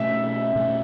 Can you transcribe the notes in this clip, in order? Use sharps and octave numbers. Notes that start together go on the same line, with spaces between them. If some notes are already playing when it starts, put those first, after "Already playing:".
Already playing: B2 A3 C#4 E5
B2 A3 C#4